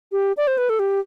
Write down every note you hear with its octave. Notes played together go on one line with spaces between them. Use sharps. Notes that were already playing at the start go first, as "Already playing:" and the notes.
G4
D5
C5
B4
A4
G4